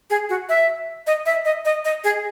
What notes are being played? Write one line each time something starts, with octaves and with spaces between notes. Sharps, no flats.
G#4
F#4
E5
D#5
E5
D#5
D#5
D#5
G#4